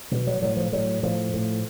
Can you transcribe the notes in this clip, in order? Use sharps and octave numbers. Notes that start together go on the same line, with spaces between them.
B2 F#3
F#3
A2 F#3
F3
A2 F#3
A2 F3
A2